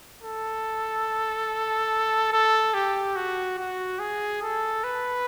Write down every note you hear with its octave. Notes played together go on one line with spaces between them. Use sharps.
A4
A4
G4
F#4
F#4
G#4
A4
B4